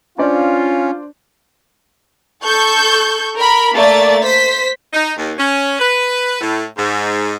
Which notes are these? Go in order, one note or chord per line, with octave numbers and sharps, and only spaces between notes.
C#4 D4 F4 C5 D5
A4 C#6 G6
A#4 B5
A3 A#3 D5 A6
C5 B6
D#4
D#2
C#4
B4
A2
G#2